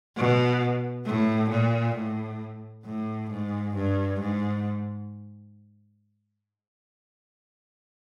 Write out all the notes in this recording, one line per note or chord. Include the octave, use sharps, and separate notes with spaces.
B2
A2
A#2
A2
A2
G#2
G2
G#2